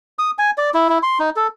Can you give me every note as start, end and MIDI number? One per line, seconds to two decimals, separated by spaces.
0.19 0.31 87
0.38 0.50 80
0.58 0.70 74
0.74 0.89 64
0.89 0.98 64
1.03 1.18 84
1.20 1.30 63
1.36 1.47 69